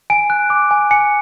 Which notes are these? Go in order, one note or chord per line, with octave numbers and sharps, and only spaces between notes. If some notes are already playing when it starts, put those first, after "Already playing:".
G#5 D7
F#6
D6
G#5
G#5 C#7